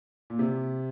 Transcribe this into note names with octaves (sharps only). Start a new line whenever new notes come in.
A#2
C3